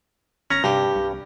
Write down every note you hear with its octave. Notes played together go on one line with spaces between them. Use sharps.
G#1 C#4 A#5
G2 C3 G4
C2